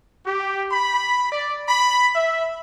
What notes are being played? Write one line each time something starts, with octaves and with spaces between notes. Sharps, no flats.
G4
B5
D5
B5
E5